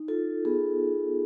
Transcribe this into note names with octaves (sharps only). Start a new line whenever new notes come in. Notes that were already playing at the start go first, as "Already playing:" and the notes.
Already playing: D#4
F4 A4
B3 G#4